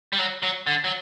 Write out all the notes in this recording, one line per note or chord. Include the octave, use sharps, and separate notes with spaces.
G3
F#3
F#3
D3
F#3